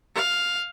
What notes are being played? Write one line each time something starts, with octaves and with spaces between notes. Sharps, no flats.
F5